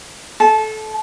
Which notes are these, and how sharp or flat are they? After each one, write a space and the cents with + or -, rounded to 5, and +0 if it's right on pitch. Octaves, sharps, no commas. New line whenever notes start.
A4 -20 A5 -20